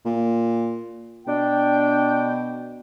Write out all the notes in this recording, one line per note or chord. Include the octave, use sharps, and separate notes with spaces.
A#2
B2 D4 G5